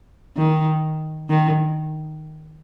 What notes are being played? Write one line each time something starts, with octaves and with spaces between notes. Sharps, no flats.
D#3
D#3